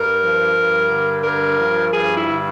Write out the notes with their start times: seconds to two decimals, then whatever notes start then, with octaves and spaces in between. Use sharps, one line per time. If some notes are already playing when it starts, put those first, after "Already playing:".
Already playing: G2 A#4
0.21 F3
0.55 G2
0.89 D3
1.23 G2 A#4
1.58 F3
1.92 G2 G#4
2.15 E4
2.27 D3